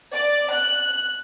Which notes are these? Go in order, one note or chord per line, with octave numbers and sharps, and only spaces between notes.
D5
F#6